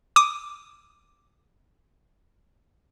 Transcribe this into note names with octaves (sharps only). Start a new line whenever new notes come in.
D6 D#6